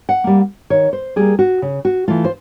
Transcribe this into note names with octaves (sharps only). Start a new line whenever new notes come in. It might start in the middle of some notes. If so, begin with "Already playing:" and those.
F#5
G3 A#3
D#3 C#5
C5
G3 A#3 G#4
F#4
C#3
F#4
E3 A3 F4
C5